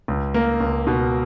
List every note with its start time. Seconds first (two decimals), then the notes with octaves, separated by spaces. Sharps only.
0.08 C#2
0.34 A#3
0.61 C#2
0.87 B2